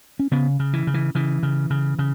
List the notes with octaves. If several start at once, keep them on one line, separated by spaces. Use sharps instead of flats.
C#4
C#3 B3
C#3
E3
C#3
E3
C#3 E3
C#3
C#3
C#3